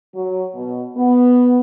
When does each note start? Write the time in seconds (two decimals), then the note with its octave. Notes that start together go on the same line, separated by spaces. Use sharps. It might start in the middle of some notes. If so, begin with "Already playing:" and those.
0.14 F#3
0.54 B2
0.96 B3